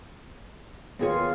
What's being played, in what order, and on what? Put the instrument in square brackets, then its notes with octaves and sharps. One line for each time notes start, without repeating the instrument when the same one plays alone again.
[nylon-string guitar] D#2 G#4 C#5 [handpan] B3 F4